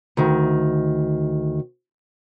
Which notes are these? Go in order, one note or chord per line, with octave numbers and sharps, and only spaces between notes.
D2 D#3